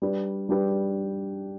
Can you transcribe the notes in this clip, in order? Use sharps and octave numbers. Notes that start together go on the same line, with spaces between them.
G3 D4 G4 B4
G3 D4 G4 B4